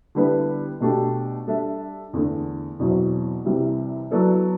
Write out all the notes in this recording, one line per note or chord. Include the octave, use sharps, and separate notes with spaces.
D3 G3 B3 E4 B4
B2 A3 D4 G4
G3 D4 A4 E5
E2 D3 A3
E2 B2 F#3 C4 E4
C2 C3 E3 G3
F#3 B3 E4 A4 D5